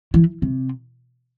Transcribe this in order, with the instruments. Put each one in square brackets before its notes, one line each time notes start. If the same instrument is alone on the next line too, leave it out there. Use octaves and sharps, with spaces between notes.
[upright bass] E3
C3